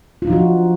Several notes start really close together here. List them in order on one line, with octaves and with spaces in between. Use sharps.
F4 D4 D#4 F3 F#4